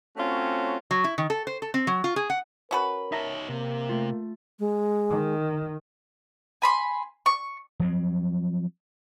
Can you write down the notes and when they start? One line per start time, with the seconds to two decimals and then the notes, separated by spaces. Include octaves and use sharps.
0.17 A3 C4 C#4 F4 F#4 C#5
0.91 F#3
1.04 E4
1.18 D#3
1.30 A4
1.47 C5
1.62 A4
1.74 C4
1.87 F#3
2.04 F4
2.16 G#4
2.30 F#5
2.71 C#4 F#4 A#4 B4
3.12 D#4 C#5 E5 A5 A#5
3.49 C3 A#3
3.89 A3 F4
4.59 G#3
5.10 D#3
6.62 G#5 B5 C6
7.26 C#6
7.80 F3 F#3 C4